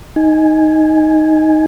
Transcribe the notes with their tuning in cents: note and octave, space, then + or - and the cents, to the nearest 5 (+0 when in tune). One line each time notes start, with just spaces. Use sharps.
D#4 +5 G#5 +0